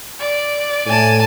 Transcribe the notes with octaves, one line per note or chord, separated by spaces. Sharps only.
D5
A2 G#5 A5